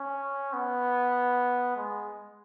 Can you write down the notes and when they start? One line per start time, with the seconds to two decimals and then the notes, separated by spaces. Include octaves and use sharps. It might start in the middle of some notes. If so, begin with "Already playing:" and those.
Already playing: C#4
0.54 B3
1.77 G#3